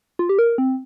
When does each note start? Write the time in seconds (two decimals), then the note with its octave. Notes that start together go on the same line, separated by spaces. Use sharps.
0.19 F4
0.29 G4
0.39 A#4
0.58 C4